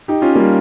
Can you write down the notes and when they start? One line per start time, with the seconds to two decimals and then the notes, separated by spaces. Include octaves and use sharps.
0.08 D#4 G4
0.22 C#4 F4
0.36 G3 A#3